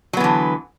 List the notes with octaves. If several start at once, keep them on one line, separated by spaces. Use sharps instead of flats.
D3 E3 F#3 B3